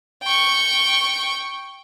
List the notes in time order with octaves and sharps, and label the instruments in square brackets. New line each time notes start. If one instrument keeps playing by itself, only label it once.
[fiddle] G5 C#6